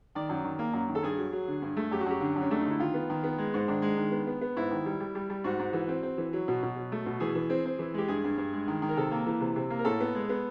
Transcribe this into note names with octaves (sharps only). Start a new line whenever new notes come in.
D#3 D5
F#2
D#3
A#3
F#2
D#3
A4
G2 G#4
F#3
F#3
D3
G2
A3
F#2 G4
F#4
F#2 G4
D3
F#2
C#4
A3 D4
D#4
D3 E4
D#3 F4
B3
D#3
B3
G#3
G#2
D#3 D4
G#3
D#3
B3
B3
B3
G#2 E4
D#3
G3
G3
G3
G3
G#2 F#4
G#2
E3
C4
C4
E3
F#3
B2
B2
F#3
A3
B2
E3 G#4
E3
C4
C4
E3
G#3 G4
G2 G#4
G2
G2
G#3
D#3
D#3
A#4
C3 A4
A#3
E3
C3
C3
A#3
A#4
A2 A4
B3
G#3
B3